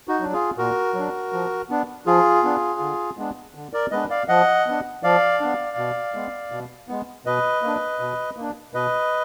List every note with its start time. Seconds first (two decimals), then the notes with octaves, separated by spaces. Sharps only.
0.08 D#4 F#4
0.20 F#3 D4
0.33 F4 G#4
0.58 A#2 F#4 A#4
0.94 F#3 D4
1.33 F3
1.70 B3 D4
2.06 F3 F4 G#4
2.44 B3 D4
2.80 D3
3.17 G#3 B3 D4
3.55 D3
3.73 A#4 D5
3.91 G#3 B3 D4 B4 D#5
4.10 D5 F5
4.28 F3 D#5 F#5
4.67 B3 D4
5.03 F3 D5 F5
5.40 B3 D4
5.77 B2
6.14 G#3 B3
6.52 B2
6.89 G#3 B3
7.25 B2 B4 D#5
7.62 A#3 D4
8.00 B2
8.37 A#3 D4
8.74 B2 B4 D#5